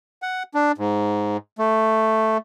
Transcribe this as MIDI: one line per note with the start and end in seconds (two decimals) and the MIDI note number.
0.22 0.43 78
0.54 0.72 62
0.78 1.37 44
1.59 2.38 57